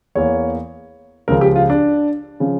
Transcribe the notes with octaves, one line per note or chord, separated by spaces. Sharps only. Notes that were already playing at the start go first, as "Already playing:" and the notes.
E2 E3 A#3 C#5
C#2 C#3 F3 A#4
G4
F4
D4
C#3 F3